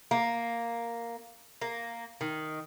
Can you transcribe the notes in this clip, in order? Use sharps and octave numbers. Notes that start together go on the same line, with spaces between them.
A#3
A#3
D#3